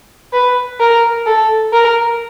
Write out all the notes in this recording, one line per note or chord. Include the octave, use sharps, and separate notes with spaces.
B4
A#4
A4
A#4